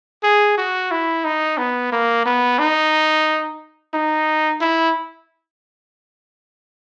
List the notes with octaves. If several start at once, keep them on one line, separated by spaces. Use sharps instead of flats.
G#4
F#4
E4
D#4
B3
A#3
B3
D#4
D#4
E4